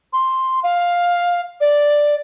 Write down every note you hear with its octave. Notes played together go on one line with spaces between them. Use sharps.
C6
F5
D5